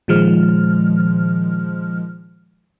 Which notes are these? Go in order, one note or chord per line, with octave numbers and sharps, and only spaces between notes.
A#2 D#3 F3 G#3 F6